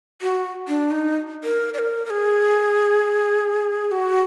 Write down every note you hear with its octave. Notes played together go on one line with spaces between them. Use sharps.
F#4
D4
D#4
A#4
D5
A#4
A#4
G#4
G#4
F#4